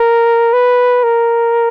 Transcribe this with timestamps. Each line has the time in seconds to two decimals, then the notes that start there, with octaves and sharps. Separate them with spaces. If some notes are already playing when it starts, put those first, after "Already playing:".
Already playing: A#4
0.53 B4
1.03 A#4